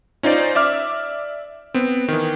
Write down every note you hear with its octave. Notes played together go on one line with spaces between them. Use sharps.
C#4 D#4 F4 C5 D5
D5 E5 D6 F6
B3 C4
D#3 E3